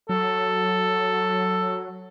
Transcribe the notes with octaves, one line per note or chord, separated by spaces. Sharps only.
F#3 A4